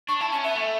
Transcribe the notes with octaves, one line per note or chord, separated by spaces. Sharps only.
D4 C#6
E4 A5
C#4 A5
B3 E5
A3